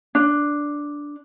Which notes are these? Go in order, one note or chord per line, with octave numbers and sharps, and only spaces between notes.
D4